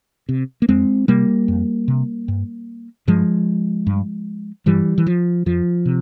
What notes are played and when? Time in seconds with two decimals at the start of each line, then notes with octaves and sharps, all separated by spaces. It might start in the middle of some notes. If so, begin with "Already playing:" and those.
0.29 C3
0.62 A#3
0.69 F2 G#3 C4
1.08 C3 G3 A#3
1.48 F2
1.88 C3
2.28 G2
3.07 G2 F3 G#3
3.87 G2
4.66 G2 E3 G3
4.98 E3
5.07 F3
5.46 F2 F3
5.86 C3